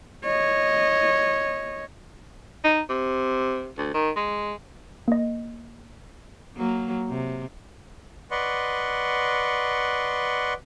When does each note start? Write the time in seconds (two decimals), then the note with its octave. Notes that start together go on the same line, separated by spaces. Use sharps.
0.24 C#5 D#5
2.64 D#4
2.89 C3
3.78 D2
3.94 D#3
4.16 G#3
5.08 A#3 D#5
6.56 F#3 A#3
7.08 C3
8.31 B4 D5 D#5 F#5 C6 C#6